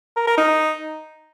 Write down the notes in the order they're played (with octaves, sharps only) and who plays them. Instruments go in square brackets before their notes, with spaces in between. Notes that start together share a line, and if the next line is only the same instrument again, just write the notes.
[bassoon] A#4
A#4
D#4